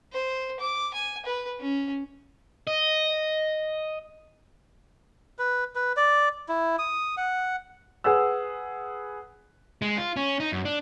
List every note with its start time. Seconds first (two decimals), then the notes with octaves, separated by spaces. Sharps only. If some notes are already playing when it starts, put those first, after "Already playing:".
0.13 C5
0.60 D6
0.94 G#5
1.25 B4
1.60 C#4
2.67 D#5
5.39 B4
5.75 B4
5.97 D5
6.49 E4
6.79 D#6
7.17 F#5
8.04 G#4 B4 F#5 E6
9.82 G#3
9.98 F4
10.16 C#4
10.40 D#4
10.52 F#2
10.65 D4